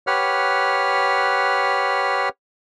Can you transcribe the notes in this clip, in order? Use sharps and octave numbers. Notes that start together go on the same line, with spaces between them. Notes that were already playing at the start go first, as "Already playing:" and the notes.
G4 B4 C#5 F#5 F6